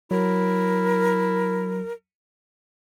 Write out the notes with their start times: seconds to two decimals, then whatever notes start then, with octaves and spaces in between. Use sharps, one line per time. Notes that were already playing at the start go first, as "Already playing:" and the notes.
0.11 F#3 E4 A#4